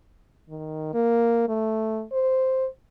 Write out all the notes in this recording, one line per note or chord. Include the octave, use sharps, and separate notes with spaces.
D#3
A#3
A3
C5